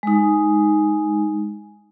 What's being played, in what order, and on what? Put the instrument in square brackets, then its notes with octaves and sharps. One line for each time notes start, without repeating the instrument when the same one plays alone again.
[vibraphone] G#3 D#4